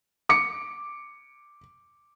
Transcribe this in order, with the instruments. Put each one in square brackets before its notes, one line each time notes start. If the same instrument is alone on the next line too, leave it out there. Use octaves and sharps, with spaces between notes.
[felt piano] D6 C#7